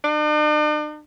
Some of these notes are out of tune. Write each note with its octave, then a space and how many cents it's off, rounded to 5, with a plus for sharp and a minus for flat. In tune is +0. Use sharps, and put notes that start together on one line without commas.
D4 +45